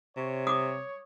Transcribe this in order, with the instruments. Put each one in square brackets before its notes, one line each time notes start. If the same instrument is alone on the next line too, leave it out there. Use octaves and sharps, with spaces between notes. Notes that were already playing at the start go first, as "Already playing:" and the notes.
[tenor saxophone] C3 [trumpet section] C#5
[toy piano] D6 D#6